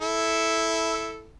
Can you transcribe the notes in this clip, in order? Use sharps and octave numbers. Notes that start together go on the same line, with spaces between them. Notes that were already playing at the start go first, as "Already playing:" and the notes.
E4 A4